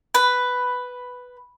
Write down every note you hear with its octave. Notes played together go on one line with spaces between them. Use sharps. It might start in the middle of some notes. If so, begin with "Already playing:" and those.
B4